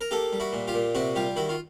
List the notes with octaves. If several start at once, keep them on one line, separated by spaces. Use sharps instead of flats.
A#4
A#3 G4 A4
G3
E4 F#4
A#2
F4 G4
A#2
C3 E4 F#4
G3 F4 G4
D#3 E4 F#4
F4